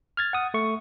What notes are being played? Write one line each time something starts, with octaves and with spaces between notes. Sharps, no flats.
F6 G#6 A6
F#5 D#6
A3 C#6